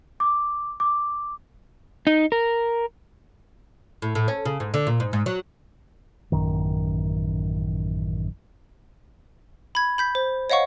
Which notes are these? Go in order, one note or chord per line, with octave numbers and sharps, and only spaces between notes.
D6
D6
D#4
A#4
A2
A2
C#4
C#3
G#2
D3
A#2
G#2
G#2
F#3
A1 F#2 D#3
B5 G#6
B5 G6 B6
C5
C#5 D#5 F5 F#5 C#6